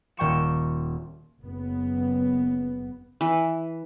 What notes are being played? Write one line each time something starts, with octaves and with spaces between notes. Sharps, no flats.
D#1 G5 C#6 E7
F#1 B3
E3